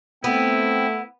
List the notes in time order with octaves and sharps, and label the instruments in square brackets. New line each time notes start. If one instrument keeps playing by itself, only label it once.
[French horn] A3 [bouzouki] B3 [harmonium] C4 G5 [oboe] E4